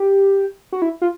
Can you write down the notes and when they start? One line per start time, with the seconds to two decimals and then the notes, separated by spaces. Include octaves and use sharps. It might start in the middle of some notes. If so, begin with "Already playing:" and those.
Already playing: G4
0.72 F#4
0.82 E4
1.02 F4